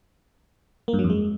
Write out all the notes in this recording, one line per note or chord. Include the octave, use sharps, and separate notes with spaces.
A#3
G2
F#3
F2
G#3